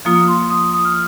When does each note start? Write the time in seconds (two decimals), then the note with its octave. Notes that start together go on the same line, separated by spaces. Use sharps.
0.05 F3 A#3 F4 D#6
0.28 C6
0.50 D#6
0.74 D#6
0.85 F6